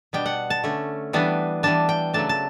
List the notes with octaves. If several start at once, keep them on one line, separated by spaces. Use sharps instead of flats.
B2 G3 B3 D4 G5
F#5
A5
D3 A3 C#4
E3 G3 B3 D4
E3 G3 D4 A5
G5
C#3 F#3 A3 D4 A5
A5